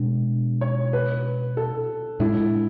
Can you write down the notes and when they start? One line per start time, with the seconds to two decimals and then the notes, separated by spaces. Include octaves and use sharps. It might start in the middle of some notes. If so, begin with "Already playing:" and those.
Already playing: B2 G#3 D4
0.61 C#5
0.93 B4
1.57 A4
2.20 A2 G#3 D4 E4